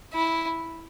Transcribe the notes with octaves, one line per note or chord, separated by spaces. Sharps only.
E4